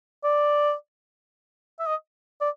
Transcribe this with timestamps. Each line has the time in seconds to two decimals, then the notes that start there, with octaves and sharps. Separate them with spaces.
0.24 D5
1.80 E5
1.87 D#5
2.41 D5